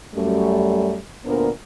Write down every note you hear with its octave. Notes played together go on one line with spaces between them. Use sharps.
F#2 G3 A3
D2 A#2 B3 D4 A#4 C5